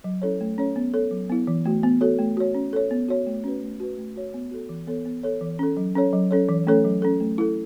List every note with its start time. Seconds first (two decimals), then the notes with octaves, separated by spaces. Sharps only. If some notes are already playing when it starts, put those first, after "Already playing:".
0.04 F#3
0.22 C#4 E4 A4 C#5
0.41 A3
0.58 C#4 A4 C#5
0.76 B3
0.94 A4 C#5
1.11 F#3
1.29 B3 E4
1.47 E3
1.65 A3 F#4
1.83 B3
2.01 F#4 A4 C#5
2.19 A3
2.37 F#4 C#5
2.55 C#4
2.73 A4 C#5
2.91 B3
3.09 F#4 C#5
3.27 A3
3.44 C#4 F#4 B4
3.62 A3
3.80 F#4 B4
3.98 A3
4.16 F#4 C#5
4.34 B3
4.51 F#4 A4
4.69 E3
4.87 B3 A4 C#5
5.06 B3
5.24 A4 C#5
5.41 E3
5.59 C#4 A4
5.77 F#3
5.95 C#4 A4 C#5
6.13 F#3
6.31 C#4 A4 C#5
6.49 E3
6.67 A3 C#4 A4 C#5
6.84 F#3
7.02 C#4 A4
7.20 A3
7.38 E4 A4